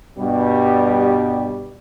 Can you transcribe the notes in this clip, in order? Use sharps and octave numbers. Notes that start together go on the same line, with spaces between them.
G2 B2 G3